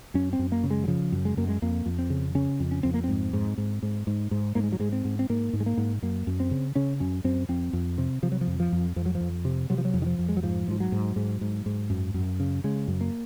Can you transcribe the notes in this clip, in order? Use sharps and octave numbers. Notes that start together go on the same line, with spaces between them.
F#2 C#4
C4
F#2
A#3
C#3
G#3
F#3
C#3 F3
F#2
G#3
F#2 A#3
G#3
F2 A#3
F2
C4
C#3
C#3 C#4
F2
C#4
F2 C4
A#3
G#2 C4
G#2
G#2
G#2
G#2
G#2
G#2 A#3
G#3
F#3
G#2 G#3
C4
G#2
C4
G#2 A#3
G#2
G#3
A#3
G#2
F#2 A#3
F#2
C4
C#3
C#3 C#4
F#2 C#4
F#2 C4
F2 C4
F2
C3
C3 F3
F#3
F3
F2
F3
F2
F2 F3
F#3
F3
F2
C3
C3 F#3
F3
F#3
F2
D#3
F3
F2
G#3
F#3
G#2 F3
G#2 F3
F#3
G#2
G#2
G#2
G#2
F#2
F#2
C#3
C#3 G#3
F#2
A#3